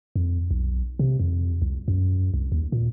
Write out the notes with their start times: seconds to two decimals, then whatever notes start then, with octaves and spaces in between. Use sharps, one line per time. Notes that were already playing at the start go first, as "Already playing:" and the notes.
0.16 F2
0.51 B1
0.99 C3
1.19 F2
1.62 C2
1.88 F#2
2.34 C2
2.52 D#2
2.72 A#2